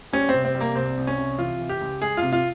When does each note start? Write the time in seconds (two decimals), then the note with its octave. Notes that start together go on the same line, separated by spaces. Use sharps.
0.13 G3 C#4
0.29 C4
0.34 C3
0.45 C4
0.55 G3
0.60 A#3
0.76 C2 C4
0.97 C2
1.07 C#4
1.18 C3
1.38 E3 F4
1.60 E3
1.69 G4
1.81 C#2
2.01 G#3 G#4
2.17 C3 F4
2.33 F4